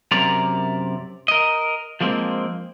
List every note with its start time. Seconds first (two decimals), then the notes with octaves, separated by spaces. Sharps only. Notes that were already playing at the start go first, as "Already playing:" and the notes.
0.11 F#2 C3 A#4 D5 A#5
1.28 A#4 D#5
2.01 F3 G#3 A#3 C4